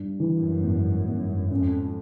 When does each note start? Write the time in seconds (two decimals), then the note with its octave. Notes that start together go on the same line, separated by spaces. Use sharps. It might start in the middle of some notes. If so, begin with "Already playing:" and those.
Already playing: G2
0.20 E3
0.35 F#2
0.63 G#1
1.08 G#1
1.51 F2 C#4